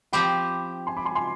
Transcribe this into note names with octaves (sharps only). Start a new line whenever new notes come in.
F3 C4 G4 G5 B5
G#5 C6
B5 D6
G#5 C6
G#5 C6